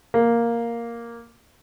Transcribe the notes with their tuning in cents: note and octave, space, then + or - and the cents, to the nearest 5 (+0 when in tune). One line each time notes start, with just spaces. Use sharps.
A#3 +0